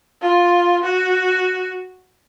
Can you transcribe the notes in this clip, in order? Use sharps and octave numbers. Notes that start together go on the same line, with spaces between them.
F4
F#4